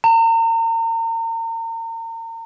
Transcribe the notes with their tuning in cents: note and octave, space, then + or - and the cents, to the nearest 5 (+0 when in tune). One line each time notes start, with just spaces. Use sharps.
A#5 -40